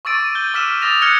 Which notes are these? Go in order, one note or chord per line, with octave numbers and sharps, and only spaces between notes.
C#6 D6 E6 A6 D7 D#7
D#7
G6 G7
D6 E6 F6 B6 D#7 E7
D6 D#6 F6 A6 A#6 F7
F6 F#6 G#6 C#7 G7